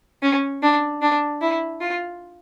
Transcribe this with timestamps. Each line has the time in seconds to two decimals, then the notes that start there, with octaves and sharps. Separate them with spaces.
0.22 C#4
0.62 D4
1.02 D4
1.41 E4
1.80 F4